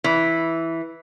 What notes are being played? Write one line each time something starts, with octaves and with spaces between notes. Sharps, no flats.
E3